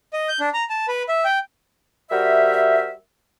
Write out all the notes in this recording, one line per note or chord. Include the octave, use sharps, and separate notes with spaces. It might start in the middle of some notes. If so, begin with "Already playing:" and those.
D#5
G6
D4
A#5
A5
B4
E5
G5
G3 F#4 A#4 C5 E5